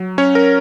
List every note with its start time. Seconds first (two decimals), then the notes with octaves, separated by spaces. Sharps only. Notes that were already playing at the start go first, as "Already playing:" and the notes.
Already playing: F#3
0.18 C#4 C#5
0.35 A#4